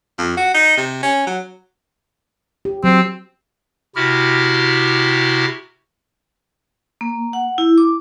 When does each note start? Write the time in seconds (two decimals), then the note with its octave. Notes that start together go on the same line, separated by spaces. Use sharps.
0.18 F2
0.37 F#4
0.54 D#4
0.77 C3
1.03 C#4
1.26 F#3
2.65 G4
2.84 F#3 C4
3.96 C3 E4 F#4 G4 F6
7.01 A#3
7.33 F#5
7.58 E4
7.78 D6